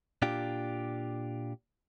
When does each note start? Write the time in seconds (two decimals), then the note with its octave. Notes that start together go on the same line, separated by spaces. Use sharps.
0.22 A#2 D4 F4 G4